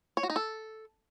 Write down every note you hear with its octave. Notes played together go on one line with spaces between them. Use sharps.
C#5
F#4
D#4
A4